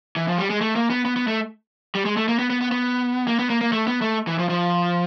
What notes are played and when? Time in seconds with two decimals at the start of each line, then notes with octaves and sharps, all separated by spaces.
0.16 E3
0.28 F3
0.38 G3
0.50 G#3
0.61 A3
0.76 A#3
0.90 B3
1.05 B3
1.16 B3
1.28 A3
1.95 G3
2.05 G#3
2.17 A3
2.28 A#3
2.39 B3
2.50 B3
2.61 B3
2.72 B3
3.28 A#3
3.39 B3
3.50 A#3
3.61 A#3
3.72 A3
3.87 B3
4.02 A3
4.27 E3
4.39 F3
4.49 F3